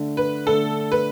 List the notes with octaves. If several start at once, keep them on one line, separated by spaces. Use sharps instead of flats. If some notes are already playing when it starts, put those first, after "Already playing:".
Already playing: D3 A3 D4
B4
D3 A3 D4 A4
B4